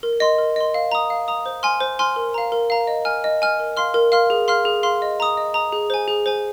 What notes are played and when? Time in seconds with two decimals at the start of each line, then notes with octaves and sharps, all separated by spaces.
0.03 A#4
0.20 D#5 C6
0.39 A#4
0.56 D#5 C6
0.74 F5
0.92 A#5 D#6
1.10 F5
1.28 A#5 D#6
1.46 C5
1.63 G#5 C6 F6
1.80 C5
1.99 G#5 C6 F6
2.16 A#4
2.34 F5 A#5
2.52 A#4
2.70 F5 A#5
2.87 D#5
3.05 G#5 F6
3.24 D#5
3.42 G#5 F6
3.60 A#4
3.77 F5 C6 F6
3.94 A#4
4.12 F5 C6 F6
4.30 G#4
4.48 F5 C6 F6
4.65 G#4
4.83 F5 C6 F6
5.02 D#5
5.20 A#5 D#6
5.37 D#5
5.54 A#5 D#6
5.73 G#4
5.90 C5 G#5
6.08 G#4
6.26 C5 G#5